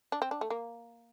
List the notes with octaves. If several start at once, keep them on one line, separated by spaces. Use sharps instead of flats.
D4
C4
D4
A3
A#3